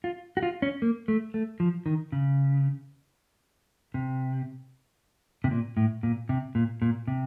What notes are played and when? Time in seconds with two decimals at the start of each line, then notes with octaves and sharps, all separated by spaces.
0.04 F4
0.37 F#4
0.43 F4
0.62 C#4
0.82 A#3
1.08 A3
1.34 A3
1.60 F3
1.86 D#3
2.12 C#3
3.94 C3
5.44 C3
5.51 A#2
5.77 A2
6.03 A#2
6.29 C3
6.55 A#2
6.82 A#2
7.08 C3